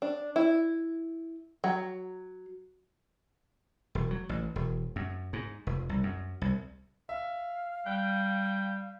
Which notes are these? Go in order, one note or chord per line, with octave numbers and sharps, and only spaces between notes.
D4
E4
F#3
E1
F#3
A1
E1
F#2
G#2
F1
C2
F#2
C2
E5 F5
G3 G5 F#6